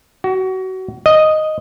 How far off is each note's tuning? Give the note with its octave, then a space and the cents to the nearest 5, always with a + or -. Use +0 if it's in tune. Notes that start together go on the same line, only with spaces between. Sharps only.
F#4 +25
D#5 +0